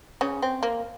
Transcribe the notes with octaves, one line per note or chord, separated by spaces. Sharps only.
C#3 C#4
C4
A#3